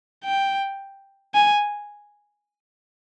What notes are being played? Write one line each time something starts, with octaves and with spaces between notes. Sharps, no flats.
G5
G#5